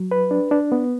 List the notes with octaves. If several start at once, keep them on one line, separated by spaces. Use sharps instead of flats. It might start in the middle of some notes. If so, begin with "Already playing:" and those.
Already playing: F#3
B4
D4
D4
B3